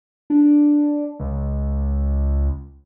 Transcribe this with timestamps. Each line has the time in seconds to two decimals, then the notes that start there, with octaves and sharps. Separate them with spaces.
0.30 D4
1.20 C#2